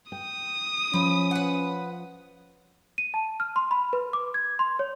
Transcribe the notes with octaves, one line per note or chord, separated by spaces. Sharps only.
G5 D#6
F3 C#4 B4
B4 F#5
D#7
A5
F6
C6
B5
B4
D6
G#6
C6
C#5